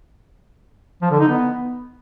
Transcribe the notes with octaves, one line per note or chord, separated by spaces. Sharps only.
F3
D3
D#4
B3